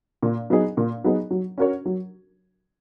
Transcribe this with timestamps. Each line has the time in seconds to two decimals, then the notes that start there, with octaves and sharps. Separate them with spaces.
0.22 A#2
0.50 F#3 B3 D#4 G#4
0.77 A#2
1.04 F#3 B3 D#4 G#4
1.31 F#3
1.58 C#4 F#4 A#4 C#5
1.86 F#3